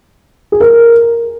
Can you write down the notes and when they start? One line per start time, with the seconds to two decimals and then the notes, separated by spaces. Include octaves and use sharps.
0.52 G#4
0.60 A#4